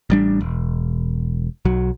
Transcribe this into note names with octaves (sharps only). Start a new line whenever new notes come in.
A1 G3 D4
E1
B1 F#3